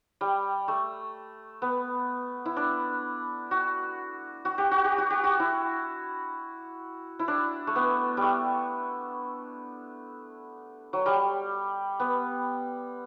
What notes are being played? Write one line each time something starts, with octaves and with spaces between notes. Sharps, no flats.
G3
A3
B3
E4
D4
F#4
F#4
G4
F#4
G4
F#4
G4
F#4
E4
E4
D4
A3
B3
G3 A3
F#3
G3
B3